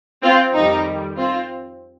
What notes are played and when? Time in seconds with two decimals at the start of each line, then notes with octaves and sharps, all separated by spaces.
0.22 C4 F4
0.54 F2 D#3 G3 D#4
1.17 C4 F4